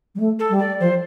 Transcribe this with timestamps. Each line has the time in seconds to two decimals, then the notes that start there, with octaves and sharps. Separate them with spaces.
0.15 G3
0.19 A3
0.39 A4
0.49 G3
0.59 D5
0.80 F3 C5